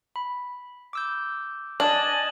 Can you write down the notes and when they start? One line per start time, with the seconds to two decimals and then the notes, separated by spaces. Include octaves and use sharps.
0.16 B5
0.93 D6 E6 G6
1.80 D4 D#5 G#5 A5 F#7